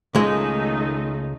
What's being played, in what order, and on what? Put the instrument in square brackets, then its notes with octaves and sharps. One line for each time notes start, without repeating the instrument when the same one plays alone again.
[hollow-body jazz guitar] C#2 G#3 [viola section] D#3 A3 D#4